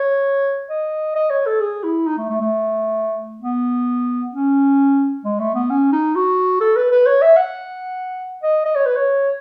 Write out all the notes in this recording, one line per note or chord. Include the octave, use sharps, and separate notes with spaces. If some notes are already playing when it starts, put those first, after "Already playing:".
Already playing: C#5
D#5
D#5
C#5
A4
G#4
E4
D#4
A3
A3
A3
B3
C#4
G#3
A3
B3
C#4
D#4
F#4
A4
B4
B4
C#5
E5
F#5
D#5
D#5
C#5
B4
C#5